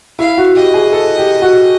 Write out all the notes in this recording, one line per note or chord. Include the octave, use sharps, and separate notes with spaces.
E4 F5
F#4
G4 D#5
G#4
A4
G4
F#4